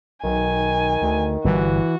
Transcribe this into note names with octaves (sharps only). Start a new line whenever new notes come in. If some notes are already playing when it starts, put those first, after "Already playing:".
B1 D#3 G#5
D2
G1 E3 G3 F#4